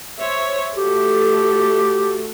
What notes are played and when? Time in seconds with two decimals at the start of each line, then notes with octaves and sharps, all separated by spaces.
0.19 C5 C#5 E5
0.77 A3 F#4 G4 A4